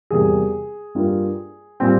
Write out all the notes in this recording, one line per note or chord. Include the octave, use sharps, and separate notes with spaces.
E2 C3 G3 A#3 G#4
G2 G3 A#3 F4
A#2 G3 C4